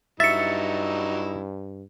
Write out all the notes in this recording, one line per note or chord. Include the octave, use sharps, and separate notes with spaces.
G2 F#3 D#4 E4 E5 A6 C#7